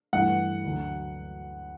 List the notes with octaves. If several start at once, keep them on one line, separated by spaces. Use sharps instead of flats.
G2 E3 A3 F#5
D2 D3 F#3